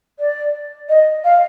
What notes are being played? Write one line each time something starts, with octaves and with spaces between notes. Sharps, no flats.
D5
D#5
F5